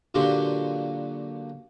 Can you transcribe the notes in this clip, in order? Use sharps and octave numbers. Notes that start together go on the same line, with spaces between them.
A#2 D3 F#3 G4 C6